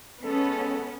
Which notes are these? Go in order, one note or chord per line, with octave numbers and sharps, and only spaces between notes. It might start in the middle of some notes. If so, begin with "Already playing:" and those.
G#3 B3 C#4 A4